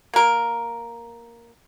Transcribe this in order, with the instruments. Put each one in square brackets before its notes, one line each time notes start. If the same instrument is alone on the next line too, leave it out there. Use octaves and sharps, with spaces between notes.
[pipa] A#3 A#4